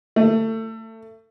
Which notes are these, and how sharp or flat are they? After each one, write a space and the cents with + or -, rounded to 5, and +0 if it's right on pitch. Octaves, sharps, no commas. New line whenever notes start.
A3 +25